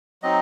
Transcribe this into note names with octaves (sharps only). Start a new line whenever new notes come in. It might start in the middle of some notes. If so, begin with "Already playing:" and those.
F#3 C4 D#4 D#5